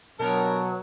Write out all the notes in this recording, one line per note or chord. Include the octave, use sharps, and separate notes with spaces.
G2 B2 F#3 B3 A#4 C#5 A5